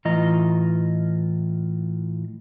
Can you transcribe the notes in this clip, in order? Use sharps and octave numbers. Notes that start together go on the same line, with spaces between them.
A2 E3 F4 D#5 A#5